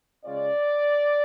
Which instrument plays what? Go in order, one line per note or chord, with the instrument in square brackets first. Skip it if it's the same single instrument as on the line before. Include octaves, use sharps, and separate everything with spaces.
[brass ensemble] C#3 G#3 C#4 F4 D5